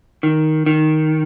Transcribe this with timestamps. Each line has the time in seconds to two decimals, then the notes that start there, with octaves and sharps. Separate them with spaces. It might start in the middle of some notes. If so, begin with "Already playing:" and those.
0.23 D#3
0.66 D#3